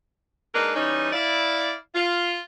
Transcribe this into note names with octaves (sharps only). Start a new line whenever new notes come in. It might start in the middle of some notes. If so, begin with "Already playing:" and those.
G#3 A#3 D4 D#4 A#4 B4
E3 G3 C#4 D#4
E4 D5 F5
F4